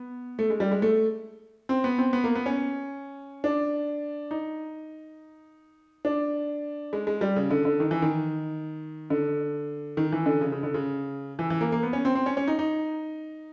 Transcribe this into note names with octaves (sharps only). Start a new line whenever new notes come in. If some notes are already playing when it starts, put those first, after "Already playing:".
Already playing: B3
A3
G#3
G3
G#3
A3
C4
B3
C4
B3
A#3
B3
C#4
D4
D#4
D4
G#3
G#3
G3
C#3
D3
D3
D#3
E3
D#3
D3
D#3
E3
D3
C#3
C#3
D3
C#3
E3
E3
A#3
A#3
B3
C#4
C4
C4
C#4
C#4
D#4
D#4